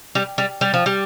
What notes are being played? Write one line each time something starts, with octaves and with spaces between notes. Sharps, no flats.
G3
G3
G3
F3
G3